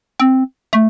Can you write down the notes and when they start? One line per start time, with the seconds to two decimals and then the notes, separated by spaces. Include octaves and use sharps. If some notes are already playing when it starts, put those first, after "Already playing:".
0.20 C4
0.73 A3